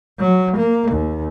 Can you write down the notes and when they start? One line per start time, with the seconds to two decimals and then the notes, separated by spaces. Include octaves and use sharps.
0.19 F#3
0.57 A#3
0.92 D#2